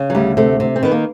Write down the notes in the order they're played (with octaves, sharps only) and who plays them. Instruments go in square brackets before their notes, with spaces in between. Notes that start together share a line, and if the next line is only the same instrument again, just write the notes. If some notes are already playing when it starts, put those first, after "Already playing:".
Already playing: [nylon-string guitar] C#3
[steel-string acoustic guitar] F#3
[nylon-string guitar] D2 [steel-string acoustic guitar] G3
[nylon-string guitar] C3 [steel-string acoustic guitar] A3
[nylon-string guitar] C3
[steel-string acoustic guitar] C4
[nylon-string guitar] D#3 [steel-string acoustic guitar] B3
[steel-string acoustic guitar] A#3